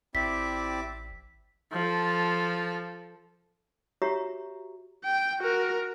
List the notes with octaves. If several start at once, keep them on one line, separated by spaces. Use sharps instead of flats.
A1 C4 E4 G4 D5 E5 D6 B6
F3 A4
F#4 G4 C#5 E5 A#5 C#6
G5
F#4 A#4